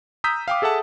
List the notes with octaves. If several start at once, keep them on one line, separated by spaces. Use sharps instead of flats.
A#5 D#6 E6 G6 B6
F5 G5 D6
G#4 A4 E5 F#5 A5